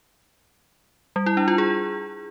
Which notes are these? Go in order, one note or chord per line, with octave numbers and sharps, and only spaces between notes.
G3
E4
D4
F4
G#4